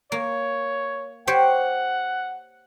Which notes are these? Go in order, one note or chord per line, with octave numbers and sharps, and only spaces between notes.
A#3 C#5
G4 C5 C#5 F#5